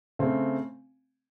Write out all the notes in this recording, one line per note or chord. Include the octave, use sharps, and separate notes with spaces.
C#3 A3 C4